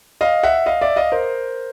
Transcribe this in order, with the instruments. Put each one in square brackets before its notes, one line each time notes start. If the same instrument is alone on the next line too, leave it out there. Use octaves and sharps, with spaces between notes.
[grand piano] D#5 F5
E5 F#5
D#5 F5
D5 E5
D#5 F5
A#4 C5